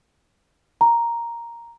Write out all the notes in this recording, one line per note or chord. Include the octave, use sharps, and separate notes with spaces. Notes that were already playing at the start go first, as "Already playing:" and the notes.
A#5